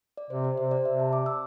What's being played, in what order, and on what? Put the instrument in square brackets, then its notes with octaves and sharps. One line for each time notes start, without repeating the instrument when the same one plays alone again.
[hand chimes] D5
[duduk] C3 [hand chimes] C5
[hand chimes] D5
[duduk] C3 [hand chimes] C5
[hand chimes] D5
[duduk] C3 [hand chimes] E5
[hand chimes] A5
D6
E6